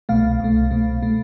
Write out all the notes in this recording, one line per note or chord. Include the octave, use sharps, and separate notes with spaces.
C2 B2 A3 F5
C2 B2 A3
C2 B2 A3
B2 A3